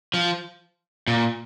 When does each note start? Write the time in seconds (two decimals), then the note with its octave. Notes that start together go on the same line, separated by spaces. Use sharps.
0.14 F3
1.08 A#2